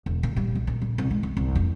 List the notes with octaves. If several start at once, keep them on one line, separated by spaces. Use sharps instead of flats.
E1
A#2
G3
B1
A#2
G3
C2
G#3
C2
C2
F1